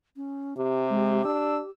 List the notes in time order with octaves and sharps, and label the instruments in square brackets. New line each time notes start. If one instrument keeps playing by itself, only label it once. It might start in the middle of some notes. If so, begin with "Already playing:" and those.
[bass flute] C#4
[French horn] C3 [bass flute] G4
[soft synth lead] G#3
[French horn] D4 [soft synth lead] E6